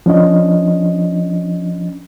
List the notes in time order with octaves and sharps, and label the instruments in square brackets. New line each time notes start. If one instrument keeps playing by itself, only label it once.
[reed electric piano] F3 C#4 D4 D#5